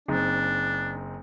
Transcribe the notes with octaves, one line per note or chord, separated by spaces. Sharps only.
F#1 C4 D4 D#4